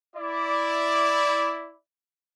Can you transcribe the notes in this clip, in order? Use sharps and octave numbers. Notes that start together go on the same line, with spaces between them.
E4 D5